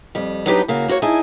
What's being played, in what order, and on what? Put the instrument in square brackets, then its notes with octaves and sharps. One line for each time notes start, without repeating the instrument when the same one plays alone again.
[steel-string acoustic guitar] F2 G3
F#3 B3 D4 D#4 G4 B4
C#3 A#3 F#4
A#3 F#4 C5 C#5
D#4 E4 G#4 G#5 A5